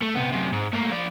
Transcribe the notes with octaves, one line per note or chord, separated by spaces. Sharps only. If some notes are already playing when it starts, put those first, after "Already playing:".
A3
C3 B3
F#2 C3
G#2
A3 A#3
F3 D5